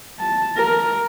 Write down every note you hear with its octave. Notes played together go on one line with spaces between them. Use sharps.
A5
A#4